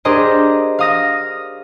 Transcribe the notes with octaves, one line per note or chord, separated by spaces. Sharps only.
D4 G4 G#4 A#4 C5 D#5
F5 D#6 A#6